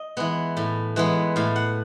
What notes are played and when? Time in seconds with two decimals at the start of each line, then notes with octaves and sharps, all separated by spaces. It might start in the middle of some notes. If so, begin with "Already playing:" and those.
Already playing: D#5
0.17 E3 G#3 B3
0.57 A2
0.96 E3 G#3 B3
1.36 A2 F5
1.56 F#5